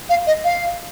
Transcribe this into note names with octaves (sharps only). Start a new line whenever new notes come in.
F5
D#5
F5